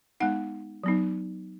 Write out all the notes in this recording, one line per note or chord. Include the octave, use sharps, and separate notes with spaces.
G#3 B3 D#4 F#5
F#3 B3 D#4